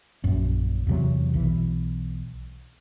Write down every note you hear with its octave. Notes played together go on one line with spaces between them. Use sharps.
A#1 F#2
E2 C3 F#3
B1 E3